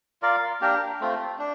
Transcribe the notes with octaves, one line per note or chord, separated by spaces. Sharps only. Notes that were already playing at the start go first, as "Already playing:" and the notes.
F4 A#4 D5 F5
A#3 D4 G4 A#4
A3 C4 F4
D4